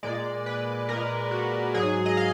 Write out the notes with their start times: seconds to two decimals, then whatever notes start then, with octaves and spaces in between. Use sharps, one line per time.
0.03 A#2 G#3 D5
0.46 B4
0.89 A#2 G#3 A#4
1.31 F#4
1.74 G#2 F#3 G#4
2.06 D#5
2.17 F5